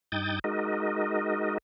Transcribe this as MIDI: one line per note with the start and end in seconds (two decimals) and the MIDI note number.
0.12 0.39 43
0.12 0.39 63
0.12 0.39 79
0.12 0.39 87
0.12 0.39 91
0.12 0.39 93
0.44 1.58 56
0.44 1.58 63
0.44 1.58 66
0.44 1.58 70
0.44 1.58 75